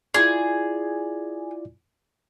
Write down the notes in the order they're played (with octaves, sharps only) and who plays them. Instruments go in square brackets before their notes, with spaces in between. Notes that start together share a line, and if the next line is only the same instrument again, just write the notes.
[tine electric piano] E4 F4 D5 [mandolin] G#4